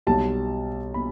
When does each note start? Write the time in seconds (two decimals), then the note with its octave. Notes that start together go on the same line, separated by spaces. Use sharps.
0.07 B1 B2 G3 A5
0.94 B2 B5